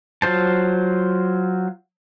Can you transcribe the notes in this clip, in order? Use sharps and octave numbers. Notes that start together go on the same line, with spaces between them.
F#3 F4 C5 A5